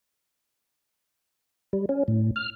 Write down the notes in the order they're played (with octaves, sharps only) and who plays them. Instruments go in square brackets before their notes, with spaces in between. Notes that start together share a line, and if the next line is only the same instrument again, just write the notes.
[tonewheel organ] G3
C#4
A2
F6